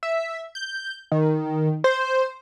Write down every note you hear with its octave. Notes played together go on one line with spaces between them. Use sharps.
E5
G6
D#3
C5